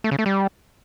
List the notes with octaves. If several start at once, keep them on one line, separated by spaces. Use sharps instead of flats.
A3
C#3
A3
G3